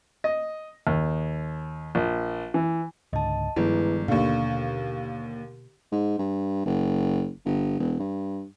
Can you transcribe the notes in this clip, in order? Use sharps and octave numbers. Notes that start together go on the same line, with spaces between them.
D#5
D#2
A#1
E3
C#2 G#2 D3 D#5 A5
G1 D#3 F3 G#3 E4 G#4 B4
D#2 B2 D3 A#3 F5 C#6
G#2
G2
F#1
G1
E1
G2